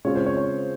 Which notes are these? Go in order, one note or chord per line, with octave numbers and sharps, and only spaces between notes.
C#3 G#3 C4 F4 C#5
C5
C#5
C#5